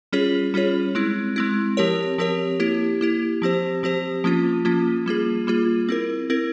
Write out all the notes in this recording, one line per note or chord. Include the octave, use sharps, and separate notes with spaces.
G3 C#4 F4 G#4 C#5
G3 C#4 F4 G#4 C#5
G#3 C4 E4
G#3 C4 E4
F3 C4 G4 A#4 C#5
F3 C4 G4 A#4 C#5
A#3 E4 G4
A#3 E4 G4
F3 C4 G4 C5
F3 C4 G4 C5
F3 A#3 C#4 F4
F3 A#3 C#4 F4
G3 A#3 F4 G#4
G3 A#3 F4 G#4
C4 E4 A#4
C4 E4 A#4